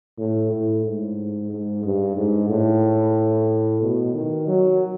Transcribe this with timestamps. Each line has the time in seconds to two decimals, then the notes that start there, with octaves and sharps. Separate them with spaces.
0.18 A2
0.51 A2
0.84 G#2
1.51 G#2
1.84 G2
2.17 G#2
2.49 A2
3.82 B2
4.14 D#3
4.47 F#3